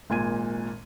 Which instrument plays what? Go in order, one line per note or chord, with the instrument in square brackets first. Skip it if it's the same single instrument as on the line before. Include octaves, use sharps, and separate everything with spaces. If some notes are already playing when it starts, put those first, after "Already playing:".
[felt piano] G#1 A#2 G#5 G#6 D#7